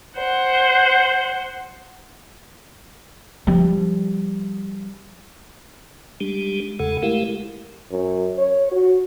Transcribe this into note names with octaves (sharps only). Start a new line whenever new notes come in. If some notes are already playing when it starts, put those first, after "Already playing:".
C5 F#5
F3 G3
G3 G#3 D4 G4
E2 C#3 G#3 A4 F#5
G#3 A3 E4 G4 A#4 F5
F#2
C#5
F#4